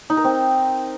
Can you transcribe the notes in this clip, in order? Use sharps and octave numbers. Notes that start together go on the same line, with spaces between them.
D#4
A#4
C4